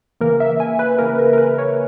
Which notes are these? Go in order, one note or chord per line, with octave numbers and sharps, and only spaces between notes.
C#3 E3 A#3 A#4
E5
G#5
B4
C#3 E3 A#3 A#4
A#4
A#4
B4
C#5